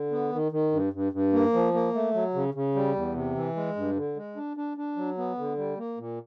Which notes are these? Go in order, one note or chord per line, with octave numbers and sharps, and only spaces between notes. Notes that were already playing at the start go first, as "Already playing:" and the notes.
Already playing: D3
B3
D#3
D#3
G2
G2
G2
A#3
F3
A#3
A3
F#3
C#3
C#3
G3
E2
C3
E3
G#3
G2
D3
G#3
D4
D4
D4
F#3
B3
D3
G3
A#3
A#2